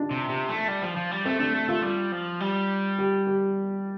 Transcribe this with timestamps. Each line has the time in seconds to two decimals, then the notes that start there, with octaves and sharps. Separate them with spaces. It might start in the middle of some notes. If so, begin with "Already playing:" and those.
Already playing: D4 D#4 F4
0.11 C3
0.29 C3
0.49 A3
0.68 G3
0.82 F3
0.96 F3
1.11 G3
1.25 A3 C4
1.39 A3 D4
1.54 A3
1.69 A3 F4
1.82 G3
2.12 F3
2.40 G3
2.99 G4
3.27 G4